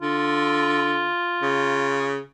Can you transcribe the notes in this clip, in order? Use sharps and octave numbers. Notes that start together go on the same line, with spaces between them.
D3 F4
C#3